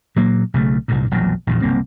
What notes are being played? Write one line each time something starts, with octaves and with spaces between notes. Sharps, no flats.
A#2 F#3 A#3
B1 C#3 F3 A3
C2 G2 A#2
E1 A#1 A#2 F#3
A#1 E2 A#2
F#1 C2 A#3 C4